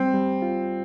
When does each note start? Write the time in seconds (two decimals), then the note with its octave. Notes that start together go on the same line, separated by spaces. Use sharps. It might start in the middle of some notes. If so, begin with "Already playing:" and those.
Already playing: G3 C4
0.14 G3
0.42 F4